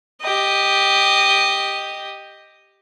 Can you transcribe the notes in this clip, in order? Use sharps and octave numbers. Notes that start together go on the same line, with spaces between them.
G4 D#5